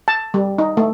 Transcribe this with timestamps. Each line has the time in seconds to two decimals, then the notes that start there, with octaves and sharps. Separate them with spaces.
0.08 A5
0.34 G3
0.58 D#4
0.77 A3